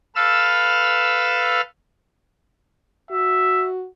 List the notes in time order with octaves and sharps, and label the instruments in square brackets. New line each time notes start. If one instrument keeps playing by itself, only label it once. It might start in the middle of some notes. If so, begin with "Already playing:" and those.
[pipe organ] A4 B4 F5 E6 F6
[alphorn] F#4 [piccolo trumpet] E5